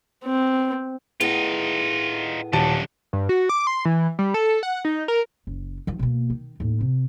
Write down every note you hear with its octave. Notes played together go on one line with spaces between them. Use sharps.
C4
A2 B3 D#4 F4 G#4
D#1 F#2 D3 A5
G2
F#4
D6
C6
E3
G3
A4
F#5
D#4
A#4
F#1
D#3 F3
B2 A#3
D#3
D#2 A2
C3